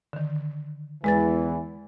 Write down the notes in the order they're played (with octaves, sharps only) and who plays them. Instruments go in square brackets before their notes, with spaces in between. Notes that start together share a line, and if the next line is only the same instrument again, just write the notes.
[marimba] D3 D#3
[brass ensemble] E2 E3 [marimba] G#3 B4 A6